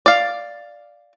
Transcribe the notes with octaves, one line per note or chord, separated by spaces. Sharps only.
D5 F5